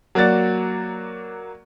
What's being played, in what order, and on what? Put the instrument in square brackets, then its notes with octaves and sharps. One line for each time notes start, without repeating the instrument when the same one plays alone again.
[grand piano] F#3 A#3 F#4 D5 A6